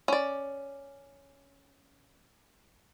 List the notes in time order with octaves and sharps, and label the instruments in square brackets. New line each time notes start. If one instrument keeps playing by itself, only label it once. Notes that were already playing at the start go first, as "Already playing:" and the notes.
[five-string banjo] C#4 D5